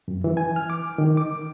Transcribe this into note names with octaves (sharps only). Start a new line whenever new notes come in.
F#2
E3
G#5
F6
D6
D#3
D6